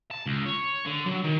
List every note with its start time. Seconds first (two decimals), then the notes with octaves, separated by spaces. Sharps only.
0.11 A5
0.26 C#2
0.46 C#5
0.86 D3
1.06 F#3
1.24 D#3